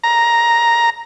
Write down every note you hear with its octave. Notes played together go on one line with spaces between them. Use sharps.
A#5